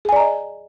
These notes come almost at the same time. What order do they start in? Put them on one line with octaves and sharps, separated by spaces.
G#4 G#5 D5 A#5 D#5